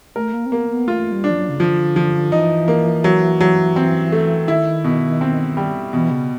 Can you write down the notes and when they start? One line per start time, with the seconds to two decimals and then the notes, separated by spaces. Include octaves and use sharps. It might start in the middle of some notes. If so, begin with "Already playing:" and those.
0.16 A3 A#4
0.33 A#3
0.46 C4
0.52 A#3 B3
0.70 B3
0.88 A3 F4
1.12 G3
1.24 D4
1.30 F3
1.36 F#3
1.49 C#3
1.60 D3 F3
1.96 F3
2.32 E3 D#4
2.68 A#3
3.04 F#3
3.41 F#3
3.76 C4
4.12 A3
4.48 D#3 E4
4.84 B2
5.21 C4
5.57 G3
5.93 B2 E3
6.11 C#3